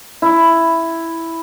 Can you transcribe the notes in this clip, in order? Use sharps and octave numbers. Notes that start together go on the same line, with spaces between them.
E4